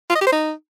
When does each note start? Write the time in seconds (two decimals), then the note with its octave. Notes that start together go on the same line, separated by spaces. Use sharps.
0.10 F4
0.15 D#5
0.21 G4
0.27 C5
0.32 D#4